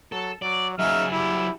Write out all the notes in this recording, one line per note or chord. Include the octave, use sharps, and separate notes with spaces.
F#3 A4
F#3 D5
C#3 F#3 D#4 G#4 E5 F6
G3 E4